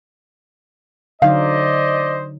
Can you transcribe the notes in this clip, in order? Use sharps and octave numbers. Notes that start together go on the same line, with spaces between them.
D3 F#3 D#4 C5 D5 D#5 F5